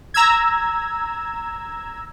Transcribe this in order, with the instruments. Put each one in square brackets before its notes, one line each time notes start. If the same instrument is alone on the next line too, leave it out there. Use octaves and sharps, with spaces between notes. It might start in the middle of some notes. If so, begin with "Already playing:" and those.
[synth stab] A#5 E6 G#6